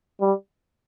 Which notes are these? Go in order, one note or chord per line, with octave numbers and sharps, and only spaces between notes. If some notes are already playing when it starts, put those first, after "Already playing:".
G3